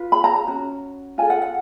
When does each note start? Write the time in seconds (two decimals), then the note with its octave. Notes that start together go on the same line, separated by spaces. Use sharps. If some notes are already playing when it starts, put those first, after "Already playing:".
Already playing: F4 B4
0.12 B5
0.24 A#5
0.36 A#5
0.48 C#4 F#4
1.18 F4 A4 G#5
1.30 F#5
1.42 F#5